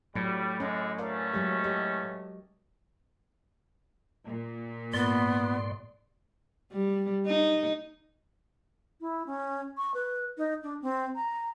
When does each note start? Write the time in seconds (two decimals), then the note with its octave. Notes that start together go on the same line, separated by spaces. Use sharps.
0.15 A2 F#3 G3
0.60 F#2 D3 G#3 C#4
0.98 E2 A3 C#4 A#4 D5 F5
1.33 F#3 G#3 G4
1.64 G4 D#5
4.27 A#2
4.94 G#2 B3 D5 C6
6.72 G3
7.27 D#4
9.01 E4
9.27 C#4
9.77 C#6
9.94 B4
10.38 D#4
10.63 D4
10.82 C4
11.15 A#5